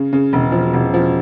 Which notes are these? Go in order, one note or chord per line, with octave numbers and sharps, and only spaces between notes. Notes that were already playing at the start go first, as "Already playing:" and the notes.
Already playing: C#3
C#3
E1
F3
E1
F3